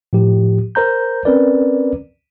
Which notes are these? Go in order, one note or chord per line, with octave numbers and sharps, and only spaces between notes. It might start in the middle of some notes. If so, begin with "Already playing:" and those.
A2 F3 G4
A#4 C5 A#5 G6
C4 C#4 A#4 B4 D5